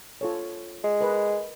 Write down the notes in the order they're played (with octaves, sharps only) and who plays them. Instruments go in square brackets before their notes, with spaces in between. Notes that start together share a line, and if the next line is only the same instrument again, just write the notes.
[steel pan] F4 A4 C#5
[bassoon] G#3
[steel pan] A#4 B4 D#5